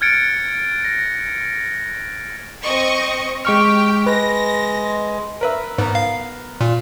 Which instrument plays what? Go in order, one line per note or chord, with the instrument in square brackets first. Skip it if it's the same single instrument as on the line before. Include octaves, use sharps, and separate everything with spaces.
[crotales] F6 F#6 G#6 A6 C#7 D7
A#6
[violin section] C4 D#5 C#6
[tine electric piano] G#3 C#6 F6 [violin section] G4 G5
[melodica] G#3 [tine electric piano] B4 [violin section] A#6
[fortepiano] A#4 B4 E5
[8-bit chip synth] G#2 [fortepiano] B3 A#4
[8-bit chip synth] F5
[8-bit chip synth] A#2 [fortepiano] F4